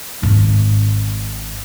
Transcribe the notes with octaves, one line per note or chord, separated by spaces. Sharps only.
G#1 D#3